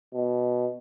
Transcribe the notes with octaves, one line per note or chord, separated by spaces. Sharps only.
B2